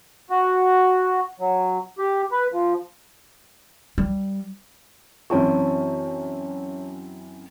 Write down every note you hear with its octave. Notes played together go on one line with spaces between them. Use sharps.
F#4
F#3
G4
B4
F3
G3
F#2 E3 C4 C#5 A5 C#6